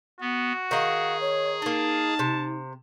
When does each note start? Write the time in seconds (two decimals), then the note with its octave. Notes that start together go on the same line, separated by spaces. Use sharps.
0.21 B3 F#4
0.71 D#3 G#4 D#5 F5
1.21 C#5
1.62 A#3 D#4 D#5 A5
2.19 C3